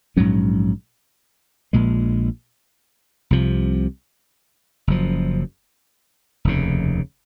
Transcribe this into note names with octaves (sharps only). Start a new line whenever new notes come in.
A#1 G#2 F#3 C#4
A#1 A#2 G#3
C2 C3 F3
F#1 F#2 F3
F1 D#2 C#3